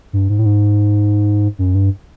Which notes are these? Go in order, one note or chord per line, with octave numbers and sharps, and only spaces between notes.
G2
G#2
A2
G#2
F#2
G2